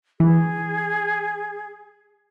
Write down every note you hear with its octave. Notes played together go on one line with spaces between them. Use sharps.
E3 G#4